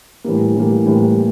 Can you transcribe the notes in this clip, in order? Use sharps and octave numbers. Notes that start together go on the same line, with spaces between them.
A2 E3 G3 A#3
A2 E3 G3 A#3
A2 E3 G3 A#3